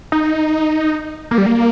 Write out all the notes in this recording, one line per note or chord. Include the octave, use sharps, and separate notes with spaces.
D#4
A#3
G3
A#3